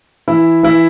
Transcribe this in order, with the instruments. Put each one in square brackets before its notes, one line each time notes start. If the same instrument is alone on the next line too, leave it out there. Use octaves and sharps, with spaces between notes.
[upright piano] E3 E4
E3 E4